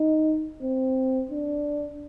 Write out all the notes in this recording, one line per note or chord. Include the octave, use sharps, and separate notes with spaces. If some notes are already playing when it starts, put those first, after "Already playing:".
Already playing: D#4
C4
D4